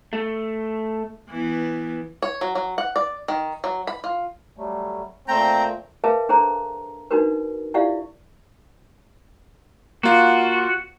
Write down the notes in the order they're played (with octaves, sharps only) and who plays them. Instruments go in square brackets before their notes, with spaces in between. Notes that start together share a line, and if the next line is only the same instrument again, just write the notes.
[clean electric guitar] A3
[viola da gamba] E3 B3
[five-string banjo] C#5
F#3
F#3
F#5
D5
D#3
F#3
B5
F4
[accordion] F#3 G3 A3
[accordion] A#2 A3 [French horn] C4 [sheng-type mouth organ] G5 A#5
[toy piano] G#4 A#4 B4 E5 F5 A5
D4 G#4 A4 C5 A#5
D4 D#4 F#4 A#4 B4
E4 F4 G4 D5 E5 F5
[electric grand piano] A#3 F4 [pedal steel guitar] F#4